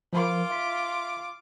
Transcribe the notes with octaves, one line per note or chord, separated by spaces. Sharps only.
F3 F4 A#4 D6
E5 C6 B6